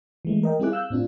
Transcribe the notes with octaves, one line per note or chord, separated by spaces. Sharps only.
E3 G#3 A3
A#4 D#5 G5
G3 C4 E4 G#4 D6 F#6
F5 E6 F#6 G6
A2 C4 D4 F4